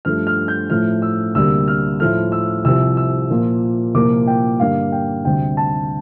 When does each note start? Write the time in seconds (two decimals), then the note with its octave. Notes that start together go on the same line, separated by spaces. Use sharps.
0.05 G2 F3 A3 F6
0.27 F6
0.48 G6
0.70 A2 F3 A3 F6
1.02 E6
1.35 D2 C3 G3 A#3 E6
1.68 F6
2.00 A2 F3 A3 F6
2.32 E6
2.65 C2 C3 F3 E6
2.97 E6
3.30 A#2 F3 A#3
3.94 C2 A#2 F3 A#3 D6
4.27 G5
4.60 G2 D3 G3 A#3 F5
4.92 G5
5.25 D2 C3 G3 G5
5.57 A5